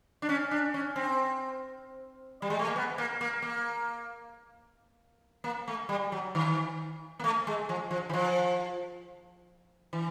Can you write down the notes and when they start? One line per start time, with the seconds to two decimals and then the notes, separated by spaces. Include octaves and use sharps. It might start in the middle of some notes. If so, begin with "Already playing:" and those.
0.22 D4
0.29 C#4
0.51 D4
0.74 C#4
0.96 C4
2.42 G3
2.50 G#3
2.59 A3
2.67 A#3
2.76 B3
2.98 A#3
3.21 A#3
3.42 A#3
5.44 A#3
5.68 A3
5.89 G3
6.12 F#3
6.35 D#3
7.19 A#3
7.24 A3
7.47 G#3
7.69 F3
7.91 F3
8.09 E3
8.13 F3
9.93 E3